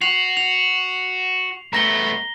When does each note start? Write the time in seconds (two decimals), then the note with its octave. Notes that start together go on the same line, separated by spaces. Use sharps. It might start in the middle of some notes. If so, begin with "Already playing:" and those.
0.01 F#4 C7 F7 F#7
0.37 F7
1.73 A3 B3 A#5 A#6 G7